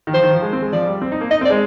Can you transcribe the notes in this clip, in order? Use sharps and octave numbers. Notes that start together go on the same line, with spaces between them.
D#3
F3 C5
D#3
F3
G#3
C4
G#3
F3 D5
G3
C4
D#4
A#3
D#4 D#5
C4
D5
G#3